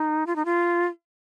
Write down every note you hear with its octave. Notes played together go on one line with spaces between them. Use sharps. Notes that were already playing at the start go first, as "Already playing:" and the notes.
Already playing: D#4
F4
D#4
F4